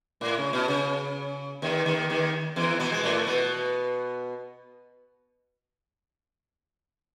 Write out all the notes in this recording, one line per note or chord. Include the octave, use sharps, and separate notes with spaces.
A2
C#3
B2
C#3
D#2 D#3
D#2 D#3
D#2 D#3
E2 E3
B2 B3
G#3
A2 A3
B2 B3